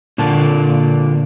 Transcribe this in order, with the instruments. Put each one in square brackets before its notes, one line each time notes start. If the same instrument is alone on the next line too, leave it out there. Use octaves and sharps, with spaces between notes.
[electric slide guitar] A#2 D3 A#3 A5